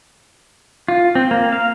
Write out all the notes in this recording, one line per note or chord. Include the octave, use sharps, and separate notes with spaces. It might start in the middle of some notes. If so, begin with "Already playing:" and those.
F4
C4
A#3
F5